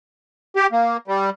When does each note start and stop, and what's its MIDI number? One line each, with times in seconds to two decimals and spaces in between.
0.56 0.67 67
0.72 0.97 58
1.08 1.30 55